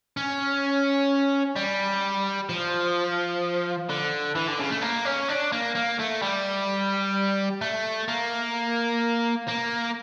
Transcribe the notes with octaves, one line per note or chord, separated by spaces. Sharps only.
C#4
G3
F3
D3
E3
D3
C#3
A3
A#3
C#4
D4
A#3
A#3
A3
G3
A3
A#3
A#3